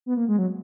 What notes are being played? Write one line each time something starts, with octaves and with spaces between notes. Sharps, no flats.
B3
A#3
G#3
F#3